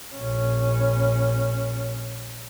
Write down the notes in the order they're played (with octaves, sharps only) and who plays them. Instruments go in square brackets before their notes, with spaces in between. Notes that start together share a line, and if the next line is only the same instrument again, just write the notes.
[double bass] A#1 C#4